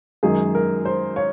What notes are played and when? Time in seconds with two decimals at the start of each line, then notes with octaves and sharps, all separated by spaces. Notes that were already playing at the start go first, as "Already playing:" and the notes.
0.23 F#2 D#3 G#3 G#4
0.55 A#4
0.85 C5
1.16 C#5